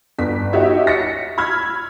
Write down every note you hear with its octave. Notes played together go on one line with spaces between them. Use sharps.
G1 B6
D#4 F#4 G4 C#5 E5
A#6 B6 C#7
B5 E6 F6 G#6